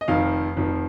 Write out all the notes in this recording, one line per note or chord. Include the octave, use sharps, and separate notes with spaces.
D#5
F1 F2 D#3 F5
F1 F2 D#3